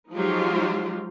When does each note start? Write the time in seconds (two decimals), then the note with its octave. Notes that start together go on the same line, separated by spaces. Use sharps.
0.13 F3 F#3 G#3 D#4 F4 G4